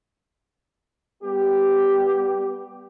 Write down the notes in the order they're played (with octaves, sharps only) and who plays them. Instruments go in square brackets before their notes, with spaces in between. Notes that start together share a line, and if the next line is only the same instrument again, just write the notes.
[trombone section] G3 B3 G4